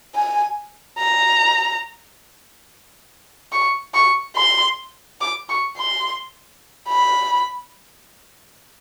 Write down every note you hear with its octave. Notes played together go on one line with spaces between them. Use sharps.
G#5
A#5
C#6
C#6
C6
D6
C#6
C6
B5